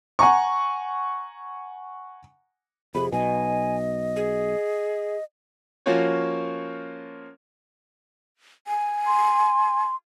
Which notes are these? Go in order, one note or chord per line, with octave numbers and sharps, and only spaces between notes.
F#5 G#5 A#5 C#6
F2 C3 G#4 B5
B1 B2 D#5 G#5
G#4
F3 A#3 C#4 F4 F#4 C#5
G#5
C6